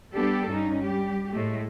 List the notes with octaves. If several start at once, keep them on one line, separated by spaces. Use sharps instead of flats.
G3 B3 D4 G4 A4
G2 G3 C#4 D#4
G3 G4
A2 G#3 A3